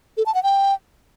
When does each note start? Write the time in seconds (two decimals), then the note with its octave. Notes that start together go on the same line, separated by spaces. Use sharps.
0.17 A4
0.26 A5
0.35 F#5
0.43 G5